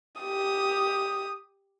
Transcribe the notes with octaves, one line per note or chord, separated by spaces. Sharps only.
G4 D#6